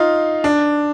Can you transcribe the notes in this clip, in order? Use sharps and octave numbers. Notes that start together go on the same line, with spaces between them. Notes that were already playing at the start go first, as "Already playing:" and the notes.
Already playing: D#4 F4
D4